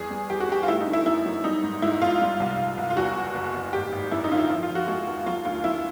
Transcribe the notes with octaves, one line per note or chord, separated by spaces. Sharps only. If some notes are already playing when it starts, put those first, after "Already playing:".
Already playing: E2 G3 G#4
G3
E2 G4
F#4
G3 G4
F4
A3 E4
D#4
D3
E4
F#2 E4
F#3
G3 D#4
G#2
G#2 E4
A#1 F4
G3
C2
C2
C2
F4
E2 F#4
F#1
F#1
F#1
G#1 G4
G#1
F#2 E4
D#4
D3 F4
E4
F3 E4
F4
F3
F#4
G#3 F#4
D#2
F#3 F4
D2 F4
F#3 E4